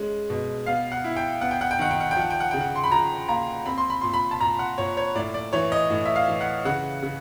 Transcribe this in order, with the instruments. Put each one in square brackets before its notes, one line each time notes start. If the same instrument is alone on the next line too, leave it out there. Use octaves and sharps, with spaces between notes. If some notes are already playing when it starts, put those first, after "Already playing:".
Already playing: [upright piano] G#3 C#4
B2
[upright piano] B3 [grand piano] F5
[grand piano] F#5
[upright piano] E4
[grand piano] G5
[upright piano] B3 [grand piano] F#5
[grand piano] G5
F#5
G5
[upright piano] D#3 [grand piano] F#5
[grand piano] G5
F#5
G5
[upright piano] F3 [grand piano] F#5
[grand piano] G5
F#5
[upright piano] C#3 [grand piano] G5
[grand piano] F#5
C6
B5
[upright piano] F3 [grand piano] A#5
[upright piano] A#3 [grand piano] A#5
[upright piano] C4 [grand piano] B5
[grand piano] C6
B5
[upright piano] A#2 [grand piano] C6
[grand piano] B5
A5
[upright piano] A#2 [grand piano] A#5
[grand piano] F#5
[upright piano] A#2 [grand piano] C#5
[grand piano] C#5
[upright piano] A2 [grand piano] D5
[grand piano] D5
[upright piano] E3 [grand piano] C#5
[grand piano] D#5
[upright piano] A2
[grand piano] E5
F5
[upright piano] E3
[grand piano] F#5
[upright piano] C#3 [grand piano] F#5
[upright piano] C#3